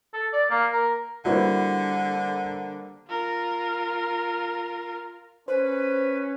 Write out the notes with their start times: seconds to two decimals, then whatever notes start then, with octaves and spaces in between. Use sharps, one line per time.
0.14 A4
0.33 D5
0.50 A#3
0.72 A#4
1.25 D3 G3 A#3 E4 F#4 B4 C5
3.08 F4 A#4
5.48 C#4 B4 C5